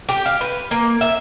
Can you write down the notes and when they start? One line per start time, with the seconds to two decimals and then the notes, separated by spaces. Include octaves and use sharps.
0.09 G4
0.25 F5
0.41 B4
0.71 A#3
1.01 E5